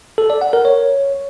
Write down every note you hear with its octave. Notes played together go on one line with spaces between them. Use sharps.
A4
D5
F#5
A#4
C#5